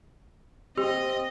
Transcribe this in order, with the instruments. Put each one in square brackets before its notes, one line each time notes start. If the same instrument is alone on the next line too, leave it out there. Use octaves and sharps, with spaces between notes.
[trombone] C4 [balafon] G4 [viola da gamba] D#5